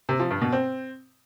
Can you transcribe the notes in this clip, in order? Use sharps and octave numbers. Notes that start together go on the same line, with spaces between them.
C3
F3
G2
B2
C4